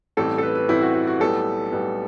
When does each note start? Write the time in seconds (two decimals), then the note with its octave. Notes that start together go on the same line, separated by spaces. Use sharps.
0.17 A1 A2 G3 C4 A4
0.38 A4
0.43 B4
0.55 B4
0.68 A1 A2 G3 C4 E4
0.81 F#4
0.94 F#4
1.07 F#4
1.20 B1 A2 G3 B3 A4
1.72 B1 A2 G3 B3